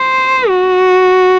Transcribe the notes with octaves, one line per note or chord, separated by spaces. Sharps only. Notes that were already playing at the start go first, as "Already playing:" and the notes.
Already playing: C5
F#4